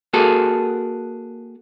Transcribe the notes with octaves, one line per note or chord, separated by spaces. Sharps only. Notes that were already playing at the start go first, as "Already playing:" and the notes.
A#3 F#4 G#4 A4